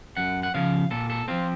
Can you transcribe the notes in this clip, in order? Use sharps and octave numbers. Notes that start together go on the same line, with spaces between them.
F#2 F#5
F#5
C#3 F3 F5
A#2 A4
A4
F3 C4 F4